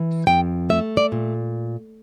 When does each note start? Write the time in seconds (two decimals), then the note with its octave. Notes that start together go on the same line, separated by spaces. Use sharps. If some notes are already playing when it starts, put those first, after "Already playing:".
Already playing: E3
0.27 F2 G5
0.70 A3 E5
0.97 D5
1.12 A#2